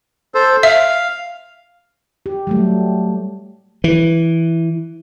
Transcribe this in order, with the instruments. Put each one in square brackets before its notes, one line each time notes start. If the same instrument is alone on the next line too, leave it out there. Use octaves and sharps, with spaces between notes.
[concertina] A4 C5
[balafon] E5 [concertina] F5
[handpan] G4
F#3 G3 A3
[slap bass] E3